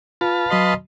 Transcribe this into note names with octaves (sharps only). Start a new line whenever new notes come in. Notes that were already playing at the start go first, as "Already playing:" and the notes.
F4 B4 F5 A5
F#3 F#4 D#5 B5 C6 C7